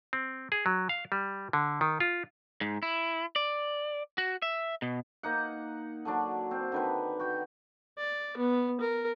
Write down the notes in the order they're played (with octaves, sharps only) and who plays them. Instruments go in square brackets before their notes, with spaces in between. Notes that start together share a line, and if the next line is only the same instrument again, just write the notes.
[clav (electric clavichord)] C4
G#4
F#3
F5
G3
D3
D#3
F4
[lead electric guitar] G#2
E4
D5
F#4
E5
B2
[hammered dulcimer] A#3 D#4 F#5
D3 F#3 D4
C4
D3 D#3 B4
F#4 G5
[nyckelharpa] D5
B3
A#4